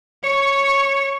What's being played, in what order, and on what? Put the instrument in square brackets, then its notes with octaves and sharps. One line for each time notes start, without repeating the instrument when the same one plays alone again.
[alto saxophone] C#5 [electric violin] C#6